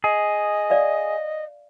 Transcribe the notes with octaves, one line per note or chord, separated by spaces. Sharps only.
G#4 D#5
D5 E5 F5